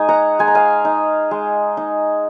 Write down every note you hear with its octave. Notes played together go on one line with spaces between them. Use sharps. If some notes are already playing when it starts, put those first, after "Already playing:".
Already playing: G#3 D#4 G#5
F#5 A#5
G#3 G#5
A#5
F5 G#5
D#4
G#3
D#4